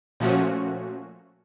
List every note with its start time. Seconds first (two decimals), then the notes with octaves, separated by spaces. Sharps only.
0.20 A#2 F3 A3 C#4 F#4